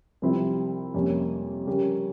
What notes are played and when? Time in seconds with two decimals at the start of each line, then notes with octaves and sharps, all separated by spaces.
0.22 C2 C3 F3 C4 E4
0.94 F2 C3 G3 A#3 C#4
1.67 C#3 G3 C#4 G4 A#4